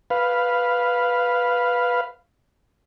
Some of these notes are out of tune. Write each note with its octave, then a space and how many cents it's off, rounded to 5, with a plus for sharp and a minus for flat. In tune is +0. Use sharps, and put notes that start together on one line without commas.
B4 +0 F5 +0